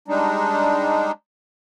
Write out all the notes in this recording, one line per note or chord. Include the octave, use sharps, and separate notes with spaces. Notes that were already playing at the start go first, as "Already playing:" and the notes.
G3 G#3 D4 D#4